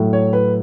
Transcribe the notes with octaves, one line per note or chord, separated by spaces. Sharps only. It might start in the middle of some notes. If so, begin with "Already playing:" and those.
Already playing: A2 F#3 A3
C#5
B4